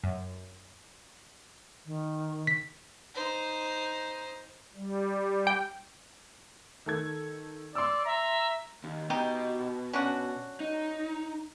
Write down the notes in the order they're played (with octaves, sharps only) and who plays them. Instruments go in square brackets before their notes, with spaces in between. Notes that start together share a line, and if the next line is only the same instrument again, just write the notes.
[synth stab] F#2
[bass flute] D#3
[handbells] B6
[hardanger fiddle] D#4 C5
[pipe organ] G3
[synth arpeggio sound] G5
[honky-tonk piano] D#3 A4 G#6
[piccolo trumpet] D5 [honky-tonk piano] C6 E6
[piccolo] E5 [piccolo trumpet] A#5
[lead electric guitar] D#2
[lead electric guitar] B2 [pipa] D#4 G4
[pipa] C#4 D4 F#4
[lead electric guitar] D#4